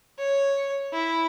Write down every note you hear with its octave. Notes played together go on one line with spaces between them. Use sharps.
C#5
E4